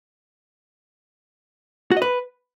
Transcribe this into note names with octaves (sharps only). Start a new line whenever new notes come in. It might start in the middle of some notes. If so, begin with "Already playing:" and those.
F#4
D#5
B4